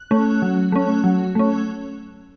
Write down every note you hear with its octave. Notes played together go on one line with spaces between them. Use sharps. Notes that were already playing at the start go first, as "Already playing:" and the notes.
Already playing: F#6
A3 C#4
F#3
A3 C#4
F#3
A3 C#4